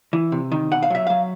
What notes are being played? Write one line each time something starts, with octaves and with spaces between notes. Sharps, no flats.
E3
C3
D#3
B2 F#5
F5
F#3 E5
F#3 F5